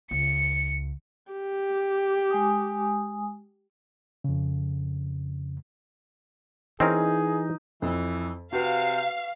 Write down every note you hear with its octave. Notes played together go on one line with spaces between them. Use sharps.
C#2 C#7
G4
G#3 G#5 D#6
F2 C#3
E3 C4 C#4 D#4 G#4 A#4
F2 E3
C3 F#4 B4 F5